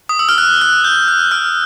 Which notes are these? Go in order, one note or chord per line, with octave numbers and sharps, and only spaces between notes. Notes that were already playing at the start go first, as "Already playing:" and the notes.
D#6
E6
F6
F#6
F#6
G6
F#6
F6